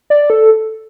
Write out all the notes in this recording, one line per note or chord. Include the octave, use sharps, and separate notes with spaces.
D5
A4